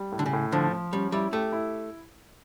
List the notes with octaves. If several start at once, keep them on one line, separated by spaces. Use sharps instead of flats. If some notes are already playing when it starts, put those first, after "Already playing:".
Already playing: G3
A2
D3
C#3
A2
D3 F3
F3
G3 C#4
G3 E4
A3 G4
E4